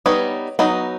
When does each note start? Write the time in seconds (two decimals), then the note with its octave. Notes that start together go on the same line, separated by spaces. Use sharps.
0.06 G3 B3 D#4 C#5 D#5
0.59 F#3 B3 D#4